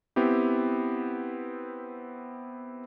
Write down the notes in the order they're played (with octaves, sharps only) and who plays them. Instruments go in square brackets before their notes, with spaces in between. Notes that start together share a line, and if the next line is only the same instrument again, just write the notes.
[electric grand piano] B3 C4 E4 G4